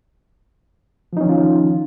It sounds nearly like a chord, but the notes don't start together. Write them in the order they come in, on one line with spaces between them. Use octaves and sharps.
F3 D#4 C#4 D#3 F4